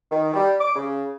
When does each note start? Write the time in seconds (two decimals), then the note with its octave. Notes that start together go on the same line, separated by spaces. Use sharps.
0.11 D#3
0.34 G3
0.60 D6
0.76 C#3